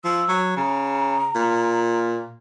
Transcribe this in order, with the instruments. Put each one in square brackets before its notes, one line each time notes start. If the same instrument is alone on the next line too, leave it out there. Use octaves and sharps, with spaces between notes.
[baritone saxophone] F3 [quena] E6
[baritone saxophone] F#3
[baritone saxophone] C#3 [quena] A#5
[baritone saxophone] A#2